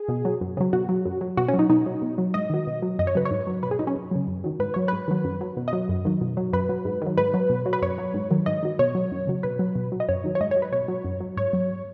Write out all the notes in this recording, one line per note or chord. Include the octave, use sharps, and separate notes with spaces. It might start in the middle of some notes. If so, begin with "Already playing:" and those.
Already playing: G#4
B2
F#3
F#2
C#3 F#3
B2 F#4
F#3
F#2
F#3
B2 F#4
C#4
F#3
D#4
B2 D#4
F#3
B2
F#3
G#2 D#5
D#3 F#3
B2
F#3
F#2 D#5
C#5
C#3 F#3 B4
C#5
G#2
F#3
B2 B4
G#4
F#3 D#4
C#4
F#2
C#3 F#3
F#2
D#3 F#3
G#2 B4
F#3 C#5
G#2 B4
D#3 F#3
F#2
F#3
B2
D#5
F#3
F#2
D#3 F#3
B2
F#3
F#2 B4
F#3
G#2
D#3 F#3
G#2 B4
F#3
B2
F#3
B4
F#2 C#5
F#3
G#2
D#3 F#3
G#2 D#5
D#3 F#3
B2 C#5
F#3
F#2
C#3 F#3
B2 B4
F#3
B2
F#3
D#5
F#2 C#5
D#3 F#3
C#5
G#2 D#5
C#5
F#3
B4
B2 C#5
F#3
F#2
F#3
G#2 C#5
F#3